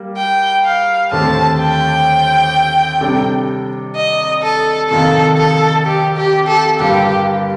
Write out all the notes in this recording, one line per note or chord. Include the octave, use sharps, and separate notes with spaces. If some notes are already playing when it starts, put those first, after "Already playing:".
Already playing: G3 A#3
G5
F5
D#2 D3 A3 C4 G4 A5
G5
C3 G3 D4 A4
D#5
A4
F2 C3 D#3 A#3 F4 A4
A4
G4
G4
A4
G2 D3 G3 A#3 F4 G4